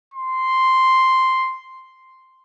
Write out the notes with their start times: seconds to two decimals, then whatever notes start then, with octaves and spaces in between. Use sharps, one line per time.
0.14 C6